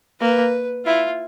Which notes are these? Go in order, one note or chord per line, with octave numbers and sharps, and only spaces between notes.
A#3 B4
E4 F4